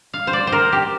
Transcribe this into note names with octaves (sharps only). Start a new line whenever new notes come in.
F5
C5
D5
C5
A#4
G4